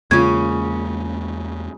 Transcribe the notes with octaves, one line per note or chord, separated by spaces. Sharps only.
E2 C#3 G#3 A#3 C#4 F4 G#6